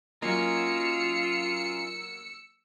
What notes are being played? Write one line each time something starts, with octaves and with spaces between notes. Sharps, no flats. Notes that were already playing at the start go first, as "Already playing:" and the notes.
F#3 A#3 C#4 D#4 F4 E6 C#7